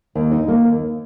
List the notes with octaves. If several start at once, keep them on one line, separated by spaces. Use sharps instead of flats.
D#2
D#4
A#3
D#2